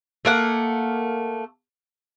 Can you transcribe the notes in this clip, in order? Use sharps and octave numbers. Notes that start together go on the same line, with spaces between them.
A3 A#3 F#5